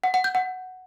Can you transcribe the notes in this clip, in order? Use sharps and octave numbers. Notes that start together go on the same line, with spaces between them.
F#5
F#5
G6
F#5